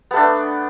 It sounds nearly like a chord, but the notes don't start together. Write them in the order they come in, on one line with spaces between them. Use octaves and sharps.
B3 A3 D4